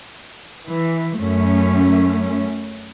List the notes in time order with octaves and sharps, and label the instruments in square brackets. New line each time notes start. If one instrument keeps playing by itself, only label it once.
[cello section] E3
F#2 A3 C#4